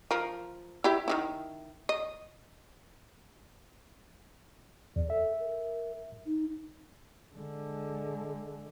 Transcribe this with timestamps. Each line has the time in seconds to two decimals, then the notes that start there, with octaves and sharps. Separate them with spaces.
0.11 F3 A#4
0.84 E4 G4 E5
1.08 D#3 D#4 E4
1.89 D#5
4.96 E2 D5
5.10 A4 E5
5.40 A#4
6.26 D#4
7.35 D3 G#3